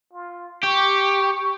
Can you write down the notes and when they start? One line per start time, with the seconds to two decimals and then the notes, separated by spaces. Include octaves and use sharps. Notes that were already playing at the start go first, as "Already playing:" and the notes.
0.13 F4
0.63 G4 C#6